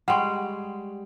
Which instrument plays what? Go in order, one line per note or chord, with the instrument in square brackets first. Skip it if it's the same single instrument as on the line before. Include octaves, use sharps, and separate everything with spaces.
[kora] G3 G#3 [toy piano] F#5 G5 C#6